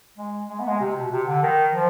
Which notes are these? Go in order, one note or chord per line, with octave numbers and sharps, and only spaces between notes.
G#3
G#3
B3
G#3
C3
B2
C3
D3
D#3
F3